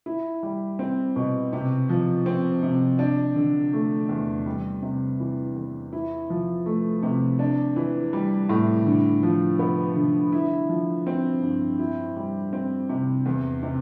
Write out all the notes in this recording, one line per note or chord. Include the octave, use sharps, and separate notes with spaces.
E4
G3
C4
B2
C3
F3
C4
C3
D4
D3
A3
E2
G3
C3
E3
E2
E4
F3
A3
C3
D4
E3
G3
A2
D3
F3
B3
D3
E4
F3
C4
G2
E4
G3
C4
C3
E2
C3